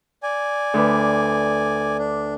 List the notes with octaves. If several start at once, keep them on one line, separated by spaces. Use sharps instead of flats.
D5 G#5
D2 B4
D4